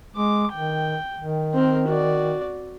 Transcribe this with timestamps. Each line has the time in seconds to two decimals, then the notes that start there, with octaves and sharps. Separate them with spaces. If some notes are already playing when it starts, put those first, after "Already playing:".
0.16 G#3 D6
0.53 D#3 G5
1.18 D#3
1.54 C4 A#4
1.88 F#4 D5